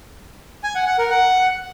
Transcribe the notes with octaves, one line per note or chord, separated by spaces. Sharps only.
G#5
F#5
F#5
A#4
F#5